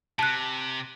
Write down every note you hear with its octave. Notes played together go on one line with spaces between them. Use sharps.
C3 A5 F#6